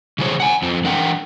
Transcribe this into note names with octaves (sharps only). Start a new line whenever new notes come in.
C#3 E3 G#3 G4 C5 C#5
F#5 G#5
F2 C4
E3 D4 A#4 F#5 G5